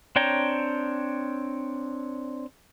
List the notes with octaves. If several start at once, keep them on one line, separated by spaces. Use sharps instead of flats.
C4 D4 C#5 G5 A#5